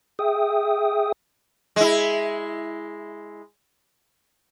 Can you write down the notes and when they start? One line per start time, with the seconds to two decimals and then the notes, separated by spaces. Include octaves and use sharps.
0.19 G#4 E5 G5 D#6
1.76 G#3 E4